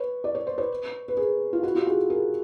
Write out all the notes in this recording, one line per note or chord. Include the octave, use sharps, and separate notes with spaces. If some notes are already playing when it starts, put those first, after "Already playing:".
Already playing: B4 C#5
D5
C#5
C5
B4 C#5
B4
G#4 A#4
F4
E4 F#4
F4 G4
F#4 G#4
G#4 A#4